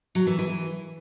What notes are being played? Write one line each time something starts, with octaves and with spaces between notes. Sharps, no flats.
F#3
E3
E3